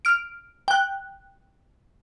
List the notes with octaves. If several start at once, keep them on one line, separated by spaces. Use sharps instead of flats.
F6 D7
G5 F#6